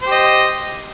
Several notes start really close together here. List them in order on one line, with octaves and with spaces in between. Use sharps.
C5 G4 D#5